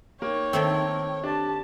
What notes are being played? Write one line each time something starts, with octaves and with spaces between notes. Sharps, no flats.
A#3 D#4 C#5 G5
D#3 A3 C4
D4 G4 A5